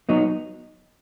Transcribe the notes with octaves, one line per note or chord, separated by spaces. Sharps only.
F#3 B3 D#4